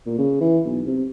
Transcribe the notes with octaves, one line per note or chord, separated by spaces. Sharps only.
A#2
C#3
E3
B1
C3